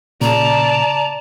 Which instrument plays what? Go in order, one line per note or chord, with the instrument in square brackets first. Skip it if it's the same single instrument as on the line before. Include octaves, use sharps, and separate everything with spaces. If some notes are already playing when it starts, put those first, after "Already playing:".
[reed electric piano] A#2 C#3 [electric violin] D5 A5 [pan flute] A#5